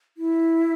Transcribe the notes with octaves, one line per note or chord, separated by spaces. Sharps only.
E4